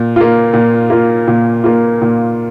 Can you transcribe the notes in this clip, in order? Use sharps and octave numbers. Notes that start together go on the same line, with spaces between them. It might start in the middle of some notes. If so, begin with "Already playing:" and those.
Already playing: A#2
A#3 F4
A#2
A#3 F4
A#2
A#3 F4
A#2